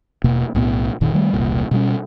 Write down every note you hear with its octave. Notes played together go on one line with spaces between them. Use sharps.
E1 B2 A#3
B1 A2 B3
F1 A#2 D#3
D#3 G3 A3
E1 C2 A#2
B2 G3 C#4